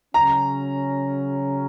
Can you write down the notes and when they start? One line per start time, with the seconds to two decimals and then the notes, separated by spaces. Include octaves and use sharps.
0.14 C#3 F#3 C#4 A#5